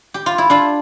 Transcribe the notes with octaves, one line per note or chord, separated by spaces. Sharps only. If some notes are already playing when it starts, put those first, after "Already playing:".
G4
F4
E4
D4 F4